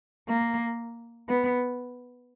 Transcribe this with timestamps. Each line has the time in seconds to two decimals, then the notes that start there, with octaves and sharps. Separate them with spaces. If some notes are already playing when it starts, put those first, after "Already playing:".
0.29 A#3
1.29 B3